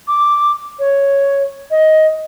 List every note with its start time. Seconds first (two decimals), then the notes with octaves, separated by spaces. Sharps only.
0.08 D6
0.79 C#5
1.71 D#5